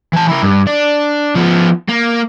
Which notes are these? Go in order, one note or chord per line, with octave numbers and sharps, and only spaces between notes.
E3 A5
E4 A#4
G2
D4
F3 B3
A#3